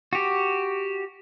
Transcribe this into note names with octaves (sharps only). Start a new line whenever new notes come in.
F#4 G4